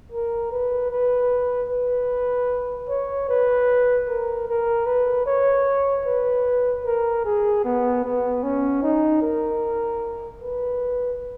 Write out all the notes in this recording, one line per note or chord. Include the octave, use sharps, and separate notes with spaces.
A#4
B4
B4
B4
C#5
B4
A#4
A#4
B4
C#5
B4
A#4
G#4
B3
B3
C#4
D#4
A#4
B4